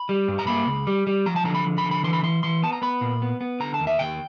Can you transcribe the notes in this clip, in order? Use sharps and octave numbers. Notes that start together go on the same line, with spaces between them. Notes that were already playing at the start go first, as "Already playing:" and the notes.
Already playing: B5
G3
G2
A#5
A#3 B5
C#2
G3
G3
F3 A#5
A5
D3 A#5
B5
F3
B5
D3
B5
E3 C6
B5
E3 C6
E3 C6
B3 A5
A#5
B3 B5
A#2
B3
B3
D3 A#5
A5
D#2
E5
D#2 G5